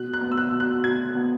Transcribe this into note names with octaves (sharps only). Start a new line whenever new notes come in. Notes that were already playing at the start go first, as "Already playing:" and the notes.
Already playing: B2 F#6
F#6
B3
E6
F#6
B2
F#6
B2 G#6
B3